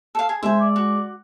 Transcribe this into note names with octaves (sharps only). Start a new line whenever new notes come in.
A4 F5
G#4
G#3 C5 E5 G#5
D5
F#4